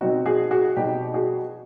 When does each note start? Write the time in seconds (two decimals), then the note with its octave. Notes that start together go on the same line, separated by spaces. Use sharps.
0.01 B2 G3 C4 D#4 F#4
0.26 F#4 G#4
0.51 F#4 G#4
0.77 B2 G3 C4 D#4 G4
1.14 F#4 G#4